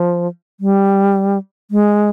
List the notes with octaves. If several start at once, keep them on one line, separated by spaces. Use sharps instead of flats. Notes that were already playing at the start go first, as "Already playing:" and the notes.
Already playing: F3
G3
G#3